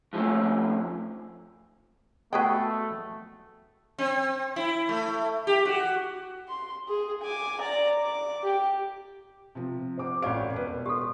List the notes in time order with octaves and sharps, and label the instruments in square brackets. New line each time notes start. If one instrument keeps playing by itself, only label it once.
[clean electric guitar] F2 F3 G#3 A3 C#4
[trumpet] A3 [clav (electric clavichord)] B3 G#4 B4 [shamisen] F#4 G5
[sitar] C4
E4
A3
G4
F#4
[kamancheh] C6
G#4
G#5 D6
D5 A#5
D6
G4
[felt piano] C3 F3
[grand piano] C5 D6
[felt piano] A1 F#4 F5 [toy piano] G4 D5 G#5 [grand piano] D7
[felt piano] E1 B4
[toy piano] G4 A4 [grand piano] C6